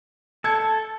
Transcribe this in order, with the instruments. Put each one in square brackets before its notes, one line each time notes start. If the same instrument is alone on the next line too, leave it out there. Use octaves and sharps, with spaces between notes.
[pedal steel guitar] A4 [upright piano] A5 G#6 C#7